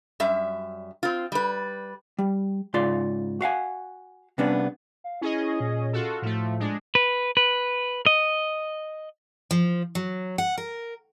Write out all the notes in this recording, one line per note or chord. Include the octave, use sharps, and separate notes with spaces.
F#2 G3 E5
C4 F4
G3 B4
G3
G#2 C#3 F4 D5 C6
F#4 F5 F#5 G#5
C3 G3 B3 C#4 D4
F5
C#4 E4 G#4 D#5
A#2
F4 F#4 A4
A2 F3 A3
G#3 D4
B4
B4
D#5
F3
F#3
F#5
A#4